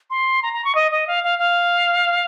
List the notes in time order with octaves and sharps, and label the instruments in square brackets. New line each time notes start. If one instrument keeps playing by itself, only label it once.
[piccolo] C6
A#5
A#5
C#6
D#5
D#5
F5
F5
F5